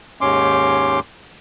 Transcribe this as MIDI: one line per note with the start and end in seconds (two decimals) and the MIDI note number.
0.21 1.00 39
0.21 1.00 44
0.21 1.00 61
0.21 1.00 84
0.21 1.00 86